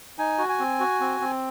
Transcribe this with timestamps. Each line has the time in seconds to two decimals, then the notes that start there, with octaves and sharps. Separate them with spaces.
0.18 D#4 G#5
0.39 F#4
0.49 G#5
0.59 C4
0.80 F#4
1.00 C4
1.21 C4